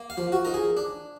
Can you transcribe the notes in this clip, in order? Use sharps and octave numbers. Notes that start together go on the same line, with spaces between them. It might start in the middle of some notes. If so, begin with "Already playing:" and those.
Already playing: A#3
F5
F3
F#4
D#4 A#4
G#4
D4